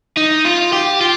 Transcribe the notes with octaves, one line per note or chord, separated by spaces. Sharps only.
D#4
F4
G4
F4